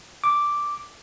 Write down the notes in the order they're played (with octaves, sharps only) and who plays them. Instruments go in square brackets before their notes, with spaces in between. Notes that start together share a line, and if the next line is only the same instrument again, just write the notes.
[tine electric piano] D6